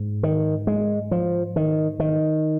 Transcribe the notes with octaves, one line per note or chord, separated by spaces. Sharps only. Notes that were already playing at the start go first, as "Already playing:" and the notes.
Already playing: G#2
D#3
G#3
F3
D#3
D#3